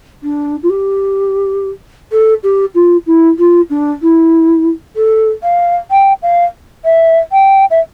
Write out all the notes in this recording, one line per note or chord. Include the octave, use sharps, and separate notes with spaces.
D4
F4
G4
A4
G4
F4
E4
F4
D4
E4
A4
F5
G5
F5
E5
G5
E5